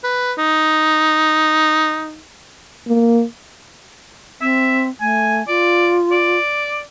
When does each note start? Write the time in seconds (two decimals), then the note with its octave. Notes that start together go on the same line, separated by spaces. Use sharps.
0.04 B4
0.38 D#4
2.87 A#3
4.41 C4 E5
5.01 A3 G#5
5.48 F4 D5
6.11 D5